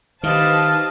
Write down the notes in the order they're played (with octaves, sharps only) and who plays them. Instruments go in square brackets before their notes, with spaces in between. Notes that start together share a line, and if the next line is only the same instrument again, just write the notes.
[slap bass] D#3 [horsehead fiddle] G4 D#5 [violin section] B4 C5 A5 [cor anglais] F5